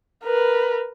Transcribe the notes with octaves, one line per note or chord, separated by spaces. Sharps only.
A#4 B4